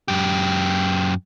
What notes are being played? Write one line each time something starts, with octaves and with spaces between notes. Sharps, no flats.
F#2 G4